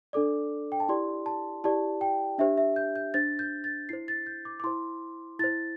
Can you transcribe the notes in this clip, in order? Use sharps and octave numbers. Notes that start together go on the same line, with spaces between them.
D4 A4 D5 D6
G5
A5
E4 G4 D5 C6
A5
E4 G4 D5 A5
G5
D4 G4 C5 E5
E5
G6
G6
D4 C5 A6
G6
A6
E4 C5 C7
A6
G6
D6
D6
E4 C5 C6
E4 C5 A6